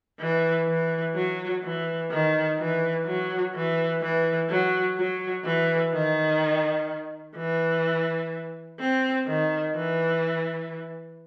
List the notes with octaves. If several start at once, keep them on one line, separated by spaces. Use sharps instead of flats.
E3
E3
F#3
E3
D#3
E3
F#3
E3
E3
F#3
F#3
E3
D#3
E3
C4
D#3
E3